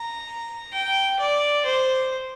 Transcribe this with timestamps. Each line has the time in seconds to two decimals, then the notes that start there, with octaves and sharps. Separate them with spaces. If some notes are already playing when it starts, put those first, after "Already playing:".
Already playing: A#5
0.73 G5
1.19 D5
1.65 C5